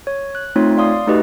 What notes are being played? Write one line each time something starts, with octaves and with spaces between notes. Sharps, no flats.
C#5
F#6
A3 C4 D#4 F4 C#5 C6
D5 F5 C6 D#6
A3 D#4 F#4 G4 B4 D#5